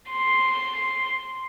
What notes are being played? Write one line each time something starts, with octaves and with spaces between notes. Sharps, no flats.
C6